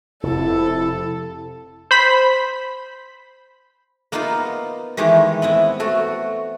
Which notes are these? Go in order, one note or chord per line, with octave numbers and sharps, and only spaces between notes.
F1 F2 C3 E4 A4
C5 B5 B6
A#3 B3 D#4 F4 A#4
D#3 E3 G#3 A3 G4
B3 C4 E4
A3 F#4 A4